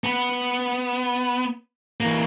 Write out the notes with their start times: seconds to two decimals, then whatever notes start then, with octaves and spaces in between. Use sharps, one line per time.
0.04 B3
2.00 E3 A#3